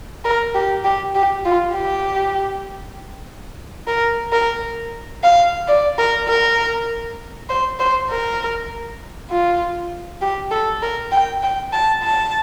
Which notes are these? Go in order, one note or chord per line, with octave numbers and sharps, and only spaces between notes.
A#4
G4
G4
G4
F4
G4
A#4
A#4
F5
D5
A#4
A#4
C5
C5
A#4
F4
G4
A4
A#4
G5
G5
A5
A5